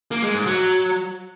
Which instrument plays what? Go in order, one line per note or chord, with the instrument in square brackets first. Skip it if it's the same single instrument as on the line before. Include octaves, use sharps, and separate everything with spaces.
[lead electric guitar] A#3
G#3
G#2
F#3